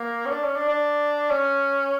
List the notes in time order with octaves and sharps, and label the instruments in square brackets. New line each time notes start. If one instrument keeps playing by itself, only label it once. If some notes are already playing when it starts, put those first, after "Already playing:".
Already playing: [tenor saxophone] A#3
C#4
D4
C#4
D4
D4
C#4